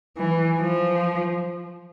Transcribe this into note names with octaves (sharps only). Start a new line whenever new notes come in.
E3
F3